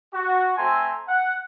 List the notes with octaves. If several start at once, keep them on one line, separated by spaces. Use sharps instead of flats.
F#4
A3 C4 C5 G#5 A#5 C6
F#5